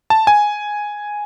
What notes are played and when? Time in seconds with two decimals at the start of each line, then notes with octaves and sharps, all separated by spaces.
0.10 A5
0.27 G#5